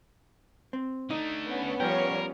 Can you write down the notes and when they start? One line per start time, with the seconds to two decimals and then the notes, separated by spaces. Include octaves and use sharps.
0.73 C4
1.10 D3 A3 D#4
1.47 B3 C#4
1.80 F3 G3 A#4 C#5 G5